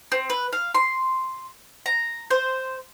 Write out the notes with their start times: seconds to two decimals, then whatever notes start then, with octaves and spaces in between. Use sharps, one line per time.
0.12 C4
0.30 B4
0.53 F5
0.75 C6
1.86 A#5
2.31 C5